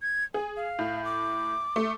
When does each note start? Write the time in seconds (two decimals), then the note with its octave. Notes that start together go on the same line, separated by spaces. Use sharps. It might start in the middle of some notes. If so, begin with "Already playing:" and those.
0.02 G#6
0.34 G#4 G#5
0.56 F5
0.79 A2
1.05 D6
1.76 A3